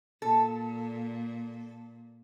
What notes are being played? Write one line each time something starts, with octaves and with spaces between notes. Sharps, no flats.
A#2 A4